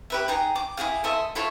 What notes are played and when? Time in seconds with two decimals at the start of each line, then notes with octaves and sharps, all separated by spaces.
0.10 G4 B4 E5
0.28 D#4 G#4 G5 A#5
0.55 D6
0.77 E4 F#4 G#4 F5
1.04 A4 D#5 E5 C6
1.35 E4 F4 A4 C#5